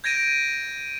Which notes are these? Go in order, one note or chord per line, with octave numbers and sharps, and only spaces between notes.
G6 G#6 A#6 D7 D#7